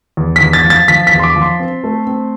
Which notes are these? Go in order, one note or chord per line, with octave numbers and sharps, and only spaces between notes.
E2
E2 B6
A6
F3
A6
F3 B6
B6
E2
C6
D6
F3
C6
C4
A3
C4